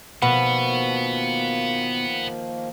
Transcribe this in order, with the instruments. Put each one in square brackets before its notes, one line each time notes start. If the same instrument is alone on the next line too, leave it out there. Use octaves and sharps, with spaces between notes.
[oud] B2 [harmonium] D#3 F3 A#3 [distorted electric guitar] B3 [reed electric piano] F#5 B5